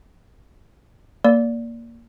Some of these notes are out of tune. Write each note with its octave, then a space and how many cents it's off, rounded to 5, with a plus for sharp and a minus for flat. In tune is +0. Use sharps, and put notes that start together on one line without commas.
A#3 +0 D5 -15